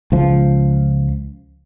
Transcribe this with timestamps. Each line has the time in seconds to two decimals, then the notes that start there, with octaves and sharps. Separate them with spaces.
0.12 C#2 F3